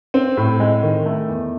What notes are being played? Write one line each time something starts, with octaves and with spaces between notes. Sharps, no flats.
C4
A2
G#3
D#3
A3
E2